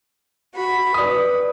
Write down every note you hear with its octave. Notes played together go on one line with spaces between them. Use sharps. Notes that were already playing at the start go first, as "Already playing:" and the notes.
F#4 B5
B4 D5 D#6